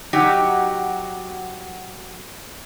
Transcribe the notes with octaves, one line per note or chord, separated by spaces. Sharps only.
F#3 D#4 F#4 G4